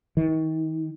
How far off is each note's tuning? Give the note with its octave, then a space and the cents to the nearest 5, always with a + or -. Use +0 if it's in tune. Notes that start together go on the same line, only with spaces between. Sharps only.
D#3 +35